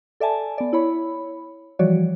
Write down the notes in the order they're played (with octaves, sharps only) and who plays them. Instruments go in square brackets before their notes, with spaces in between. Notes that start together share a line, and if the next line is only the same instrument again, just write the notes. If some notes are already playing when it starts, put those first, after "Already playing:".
[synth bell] A4 D5 E5 G#5 A5
B3 D5
E4 C#5 B5
E3 F3 G3 F#4 C#5 D5